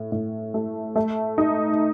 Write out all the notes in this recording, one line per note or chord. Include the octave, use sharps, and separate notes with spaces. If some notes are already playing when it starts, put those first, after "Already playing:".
Already playing: A2
A2
A3
A3
D#4